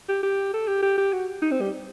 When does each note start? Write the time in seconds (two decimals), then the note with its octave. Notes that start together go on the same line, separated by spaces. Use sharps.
0.09 G4
0.23 G4
0.53 A4
0.68 G4
0.82 G4
0.97 G4
1.13 F#4
1.42 D#4
1.51 C4
1.61 G3